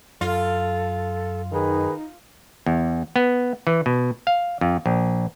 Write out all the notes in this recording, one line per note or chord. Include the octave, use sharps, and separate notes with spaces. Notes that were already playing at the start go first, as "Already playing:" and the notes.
F#2 F4 A4
D#3 D#4 G#4 B4
E2
B3
E3
B2
F5
F2
A#1